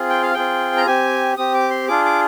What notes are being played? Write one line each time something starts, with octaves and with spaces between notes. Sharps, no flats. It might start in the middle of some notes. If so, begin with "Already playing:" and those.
Already playing: C4 F4 G#4
G5
F5
C4 F4 G#4 G5
A#5
C4 G4 G#5
C4 G4 D#6
D6
C6
D4 F4 G#4 D6
D6